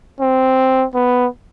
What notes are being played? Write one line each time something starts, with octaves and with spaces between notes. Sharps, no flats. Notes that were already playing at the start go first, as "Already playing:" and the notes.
C4
B3